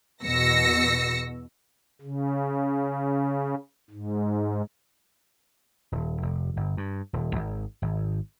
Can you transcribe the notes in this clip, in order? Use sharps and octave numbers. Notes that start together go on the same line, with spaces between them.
E2 B2 E6 A#6 C#7
C#3
G#2
D#1
F1
G1
G2
D#1
G#1
G#1